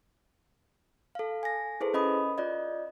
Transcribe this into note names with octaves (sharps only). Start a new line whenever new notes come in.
A4 F5
G#5 A#6
E4 G#4 A4 B4 C5
C#4 D#5 B5 D#6
F4 D5 D#5